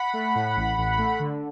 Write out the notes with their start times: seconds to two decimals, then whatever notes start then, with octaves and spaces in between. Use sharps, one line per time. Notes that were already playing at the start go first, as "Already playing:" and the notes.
Already playing: F#5 B5
0.13 A3
0.35 A2
0.56 A1
0.78 A1
0.98 A3
1.20 D3